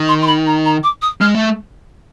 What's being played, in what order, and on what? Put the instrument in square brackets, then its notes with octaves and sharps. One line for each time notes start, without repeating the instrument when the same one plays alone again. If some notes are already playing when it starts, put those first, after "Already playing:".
Already playing: [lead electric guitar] D#3
[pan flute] C6
C6
B5
A#5
A#5
D6
D#6
[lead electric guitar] G#3 [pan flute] F6
[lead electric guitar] A3